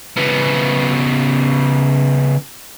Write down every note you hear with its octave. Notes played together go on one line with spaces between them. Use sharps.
C#3 B3